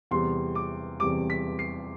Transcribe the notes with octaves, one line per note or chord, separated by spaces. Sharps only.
E2 C3 G3 C4 C6
D6
E2 C3 G3 C4 D6
B6
C7